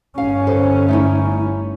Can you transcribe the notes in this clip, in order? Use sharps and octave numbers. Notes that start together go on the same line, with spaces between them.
G1 C#4 F5
A4 B4 C5
A3 D#4 E4